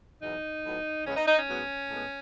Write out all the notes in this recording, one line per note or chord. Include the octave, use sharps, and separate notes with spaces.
E2 B2 F#3 D#4
A2 F#3 B3
E2 C#3 G#3 B3 C#4
D#4
D#4
C#4
G#2 F#3 B3
A2 G#3 B3